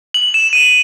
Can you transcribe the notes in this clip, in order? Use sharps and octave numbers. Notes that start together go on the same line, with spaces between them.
F#7
E7
D#7